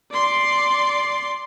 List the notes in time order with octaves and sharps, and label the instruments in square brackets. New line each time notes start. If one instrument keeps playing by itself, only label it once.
[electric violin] D5 C6